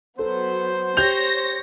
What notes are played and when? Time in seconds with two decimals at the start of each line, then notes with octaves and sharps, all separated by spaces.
0.19 F#3 B3 A4 C5
0.97 G4 C#5 G6 A#6 F7